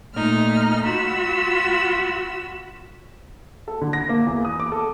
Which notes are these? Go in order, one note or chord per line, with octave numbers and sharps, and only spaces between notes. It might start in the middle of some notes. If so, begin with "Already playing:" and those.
A#2 A3 D#4 F6
F4 F#4 B5 E6
A4
D3
A#6
A#3
E2
D#6
D6
A4